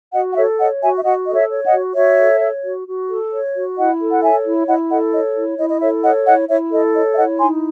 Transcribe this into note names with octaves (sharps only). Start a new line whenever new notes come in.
F#4 D#5 F#5
F#5
A4 C#5 E5
C#5 D#5 F#5
F#4 E5 G#5
E5
F#4 D#5 F#5
A4 D#5
C#5 E5
C#5
D#5 F#5
F#4
F#4 C#5 E5
A4
C#5
F#4
F#4
A4
C#5
F#4
E4 D#5 F#5
A4
F#5
C#5 E5 G#5
E4
E4 D#5 F#5
A4 D#5 F#5
C#5 D#5
E4
E4 D#5
D#5
A4 C#5 E5
C#5 D#5 F#5
E4 D#5 F#5
E4 C#5 E5
A4 D#5
C#5 D#5
E5
E4 D#5 F#5
D#4 G#5 C6